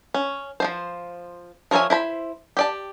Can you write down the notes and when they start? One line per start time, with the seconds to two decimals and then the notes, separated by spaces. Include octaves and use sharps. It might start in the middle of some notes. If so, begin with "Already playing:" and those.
0.14 C#4
0.60 F3 A3 C5
1.71 F3 A#4 C#5 E5 G#5
1.90 E4 C5 A#5 B5
2.57 G4 D5 A5